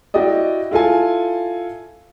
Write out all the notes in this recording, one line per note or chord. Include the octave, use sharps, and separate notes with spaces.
E4 F#4 G4 D5 D#5
E4 F4 A4 G#5